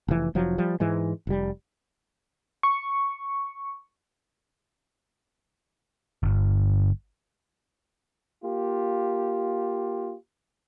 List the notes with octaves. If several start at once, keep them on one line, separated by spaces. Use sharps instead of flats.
F1 E3
F1 F3 F#3
F3 G3
G#2 E3 G#3
F1 G3
C#6
G1
A#3 F4 G4